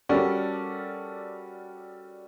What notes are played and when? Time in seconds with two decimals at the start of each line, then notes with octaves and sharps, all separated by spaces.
0.09 G3 C#4 F#4 A4 A#4 D5